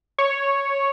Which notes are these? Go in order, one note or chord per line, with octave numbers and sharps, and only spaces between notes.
C#5